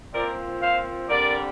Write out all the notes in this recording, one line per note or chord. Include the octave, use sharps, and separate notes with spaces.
A#2 F3 C4 A#4 D5
C5 F5
D3 G3 C4 A#4 D5